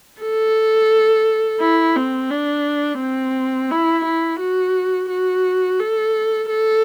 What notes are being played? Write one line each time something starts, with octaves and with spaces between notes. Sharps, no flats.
A4
E4
C4
D4
C4
E4
E4
F#4
F#4
A4
A4